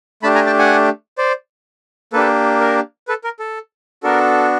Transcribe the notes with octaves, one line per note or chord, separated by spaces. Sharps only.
A3 D4 G4 A5 B5
G#5 A#5
G5 A5
F#5 G#5
C5 D5
A#3 D4 G4 A4 B4
A#4
A4 B4
A#4
A4
B3 D4 F#4 A4 A#4